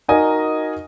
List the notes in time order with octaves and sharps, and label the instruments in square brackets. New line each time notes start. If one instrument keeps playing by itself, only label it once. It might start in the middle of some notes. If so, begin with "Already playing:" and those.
[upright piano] D#4 F#4 A#4 D#5 G#5